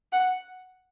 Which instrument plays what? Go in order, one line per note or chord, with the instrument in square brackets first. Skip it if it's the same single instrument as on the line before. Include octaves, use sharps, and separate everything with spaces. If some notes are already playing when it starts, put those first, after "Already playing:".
[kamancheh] F#5